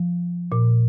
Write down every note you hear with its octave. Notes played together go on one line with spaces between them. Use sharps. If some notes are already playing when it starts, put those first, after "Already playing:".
Already playing: F3
A#2